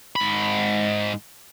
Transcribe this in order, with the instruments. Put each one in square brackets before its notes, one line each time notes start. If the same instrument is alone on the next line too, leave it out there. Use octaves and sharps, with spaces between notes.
[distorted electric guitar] G#2 B5